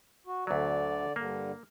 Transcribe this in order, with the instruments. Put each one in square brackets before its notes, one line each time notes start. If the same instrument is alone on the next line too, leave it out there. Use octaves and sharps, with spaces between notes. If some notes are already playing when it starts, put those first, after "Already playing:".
[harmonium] F#4
[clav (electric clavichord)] D2 F#3 [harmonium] D3 D5
[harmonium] G2 D3 [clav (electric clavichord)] A#3